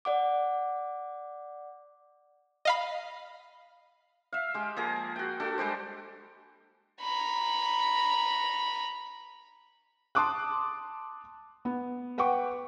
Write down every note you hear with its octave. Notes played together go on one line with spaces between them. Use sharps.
D5 F#5 D6
D#5 F5 B5
E5 F5
G#3 G4
F3 A#3 G#4 A#5
F#4 G5
D4 F#4 A4
G3 G#3 F#4 C5
A#5 B5
A5 C6 D6 D#6 F#6
B3
B4 F#5 G5 C#6 D6